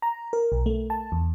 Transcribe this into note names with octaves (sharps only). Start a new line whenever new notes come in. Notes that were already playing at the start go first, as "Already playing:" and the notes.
A#5
A#4
B1
A3
A5
E2